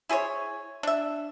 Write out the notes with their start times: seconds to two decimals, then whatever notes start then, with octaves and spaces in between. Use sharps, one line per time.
0.09 E4 G#4 C5 C#5
0.83 D4 E5